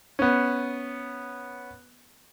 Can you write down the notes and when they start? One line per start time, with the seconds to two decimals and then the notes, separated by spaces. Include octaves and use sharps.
0.19 B3 C#4